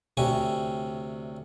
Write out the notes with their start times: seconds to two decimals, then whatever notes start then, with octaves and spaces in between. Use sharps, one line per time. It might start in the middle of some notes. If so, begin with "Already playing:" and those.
0.17 D2 C3 G4 C#5 G#5